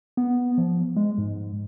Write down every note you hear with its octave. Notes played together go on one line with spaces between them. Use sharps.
B3
F3
G#3
G#2